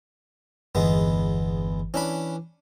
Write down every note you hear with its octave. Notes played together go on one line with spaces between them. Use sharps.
G1 E2 G#3 B3
E3 C#4 D4 B5